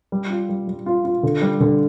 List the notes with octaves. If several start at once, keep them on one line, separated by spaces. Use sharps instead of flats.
G3
F4
G3
G3
F4
F4
D3
G3
D3